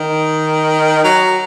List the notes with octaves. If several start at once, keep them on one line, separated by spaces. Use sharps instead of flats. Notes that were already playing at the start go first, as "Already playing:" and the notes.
Already playing: D#3
F#3